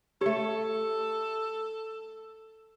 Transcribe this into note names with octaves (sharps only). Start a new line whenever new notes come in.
A3 G4 A4 C#5